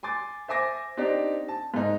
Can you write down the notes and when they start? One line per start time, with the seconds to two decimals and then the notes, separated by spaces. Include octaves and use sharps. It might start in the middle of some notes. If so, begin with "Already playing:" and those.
0.03 G#5 C6 D6 A6
0.48 C5 E5 G#5 D6 A#6
0.97 C4 D4 D#4 G4
1.48 A5
1.74 G#2 D#4